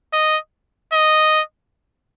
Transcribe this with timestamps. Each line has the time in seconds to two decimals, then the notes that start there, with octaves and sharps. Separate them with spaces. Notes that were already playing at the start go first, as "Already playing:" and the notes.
0.13 D#5
0.93 D#5